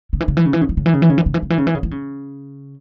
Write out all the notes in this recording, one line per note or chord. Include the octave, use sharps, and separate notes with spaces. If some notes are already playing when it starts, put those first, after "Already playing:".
C#3
E3
C#3
E3
C#3
E3
C#3
E3
C#3
E3
C#3
E3
C#3
E3
C#3
E3
C#3
E3
C#3
E3
C#3
E3
C#3